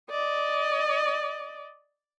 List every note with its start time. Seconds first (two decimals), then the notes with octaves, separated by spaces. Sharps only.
0.10 D5 D#5